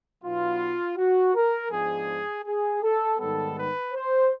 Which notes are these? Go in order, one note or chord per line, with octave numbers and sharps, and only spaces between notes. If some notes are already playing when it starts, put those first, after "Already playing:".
B2 F#3 B3 D#4 F4
F#4
A#4
G#2 F3 G#3 B3 D4 G#4
G#4
A4
G#2 D#3 G3 B3 A4
B4
C5